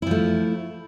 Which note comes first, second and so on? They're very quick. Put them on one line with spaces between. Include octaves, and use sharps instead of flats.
E4 F3 A3